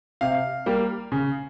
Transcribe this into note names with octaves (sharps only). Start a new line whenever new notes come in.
C3 F5
G3 A#3
C#3